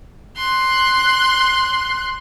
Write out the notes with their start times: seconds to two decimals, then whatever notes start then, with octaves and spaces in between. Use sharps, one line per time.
0.37 C6 F#6